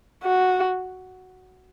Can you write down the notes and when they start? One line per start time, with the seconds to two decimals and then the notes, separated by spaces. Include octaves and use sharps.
0.24 F#4